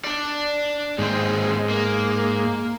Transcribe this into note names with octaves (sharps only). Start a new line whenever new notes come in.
D4 D5
D#2 G#2 C4
A#3